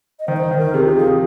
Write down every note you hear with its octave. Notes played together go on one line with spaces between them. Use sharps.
D#5
D#3 C5
D#5
C5
D#3
A#4
C3 G#4
F4
F3 G#4